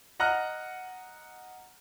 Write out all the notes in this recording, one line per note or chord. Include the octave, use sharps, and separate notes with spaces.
D#5 F#5 A#5 F6 F#6